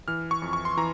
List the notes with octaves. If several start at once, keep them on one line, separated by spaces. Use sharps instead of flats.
E3 F6
C#6
F2
C#6
C6
E3 A#5